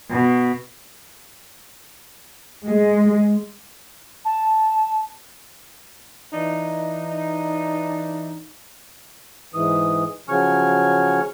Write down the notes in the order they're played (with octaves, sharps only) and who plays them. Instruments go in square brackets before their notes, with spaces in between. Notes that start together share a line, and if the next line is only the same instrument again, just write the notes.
[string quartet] B2
[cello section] G#3
[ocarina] A5
[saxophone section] E3 D4 D#4
[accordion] G#2 E3 D#6
C#3 F3 F#3 G#5 C#6 F6